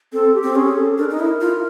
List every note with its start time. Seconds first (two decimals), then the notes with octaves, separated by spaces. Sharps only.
0.13 C4 A4
0.35 G4
0.43 C4
0.55 C#4 G#4
0.66 G#4
0.77 A4
0.98 D4 A#4
1.11 D#4
1.20 E4
1.41 F4